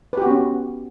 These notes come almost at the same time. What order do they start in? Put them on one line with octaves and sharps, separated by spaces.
B4 G4 F#4 B3 C#4